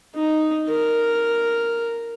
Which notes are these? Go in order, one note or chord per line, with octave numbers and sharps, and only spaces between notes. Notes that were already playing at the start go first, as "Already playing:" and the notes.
D#4
A#4